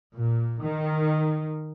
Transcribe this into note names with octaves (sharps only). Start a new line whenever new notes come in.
A#2
D#3